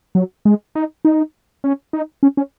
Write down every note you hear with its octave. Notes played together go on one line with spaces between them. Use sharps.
F#3
G#3
D#4
D#4
C#4
D#4
C#4
C#4